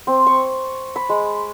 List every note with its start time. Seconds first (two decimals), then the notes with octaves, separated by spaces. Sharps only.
0.07 C4
0.27 C#6
0.96 B5
1.09 G#3